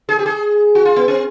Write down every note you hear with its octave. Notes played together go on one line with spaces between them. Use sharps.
G#4
G4
G#4
F#4
F4
B3
C4